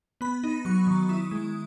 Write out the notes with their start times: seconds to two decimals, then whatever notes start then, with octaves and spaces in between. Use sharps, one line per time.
0.21 B3 B5
0.44 D#4
0.65 F#3 C#6
0.87 D#3
1.09 E4 D#6
1.31 G#3